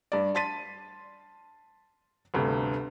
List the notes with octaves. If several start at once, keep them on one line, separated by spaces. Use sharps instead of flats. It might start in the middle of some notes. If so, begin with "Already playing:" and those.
G2 D5
A5 C6 A6 B6 D#7
G1 D2 C3